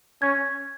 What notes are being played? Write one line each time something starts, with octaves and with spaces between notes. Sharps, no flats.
C#4 G#6